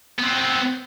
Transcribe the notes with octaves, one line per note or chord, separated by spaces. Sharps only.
B3 C4